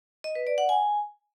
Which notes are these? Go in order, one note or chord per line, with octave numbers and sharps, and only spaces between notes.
D#5
B4
D5
F#5
G#5